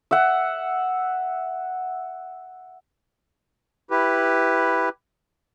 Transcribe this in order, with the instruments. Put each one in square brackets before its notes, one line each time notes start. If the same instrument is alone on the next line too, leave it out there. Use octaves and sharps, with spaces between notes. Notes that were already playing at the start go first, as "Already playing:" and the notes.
[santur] E5 F#5
[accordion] E4 G4 B4